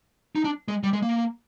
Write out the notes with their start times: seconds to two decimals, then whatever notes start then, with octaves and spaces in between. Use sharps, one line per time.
0.36 D#4
0.44 D4
0.68 G#3
0.83 G3
0.93 G#3
1.02 A#3